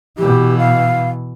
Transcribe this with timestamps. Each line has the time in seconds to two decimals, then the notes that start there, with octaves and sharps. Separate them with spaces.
0.18 B2 E3 G4
0.58 F5